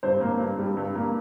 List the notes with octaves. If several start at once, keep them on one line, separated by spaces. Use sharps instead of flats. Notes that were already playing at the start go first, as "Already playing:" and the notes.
G2 C5
A#3
G2
G3
G2
A#3